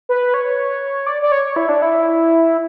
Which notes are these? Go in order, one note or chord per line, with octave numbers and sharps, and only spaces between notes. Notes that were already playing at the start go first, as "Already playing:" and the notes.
B4
C#5
D5
D5
C#5
E4
D4
E4